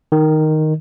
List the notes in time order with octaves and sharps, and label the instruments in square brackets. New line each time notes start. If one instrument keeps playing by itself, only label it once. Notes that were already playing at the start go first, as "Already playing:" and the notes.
[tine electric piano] D#3